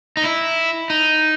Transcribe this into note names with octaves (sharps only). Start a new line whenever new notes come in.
D#4
E4
D#4